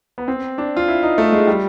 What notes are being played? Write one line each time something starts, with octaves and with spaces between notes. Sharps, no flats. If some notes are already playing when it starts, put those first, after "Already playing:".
B3
C4
D4
F4
E4
D#4
A3
G#3
G3